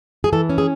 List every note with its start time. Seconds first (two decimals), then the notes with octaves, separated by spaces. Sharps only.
0.24 G#4
0.33 E3 A4
0.49 C#4
0.58 G#4